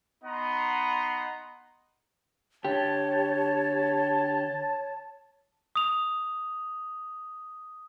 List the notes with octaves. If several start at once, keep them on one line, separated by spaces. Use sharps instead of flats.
B3 D#4 D#5 F#5 A#5 C6
D3 G4 C#5 A5
D#6 F7